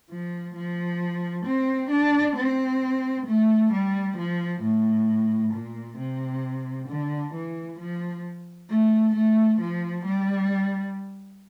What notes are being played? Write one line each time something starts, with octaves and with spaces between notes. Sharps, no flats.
F3
F3
C4
D4
C4
A3
G3
F3
A2
A#2
C3
D3
E3
F3
A3
A3
F3
G3